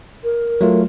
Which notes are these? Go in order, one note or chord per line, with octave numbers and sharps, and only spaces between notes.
A#4
F#3 A3 F4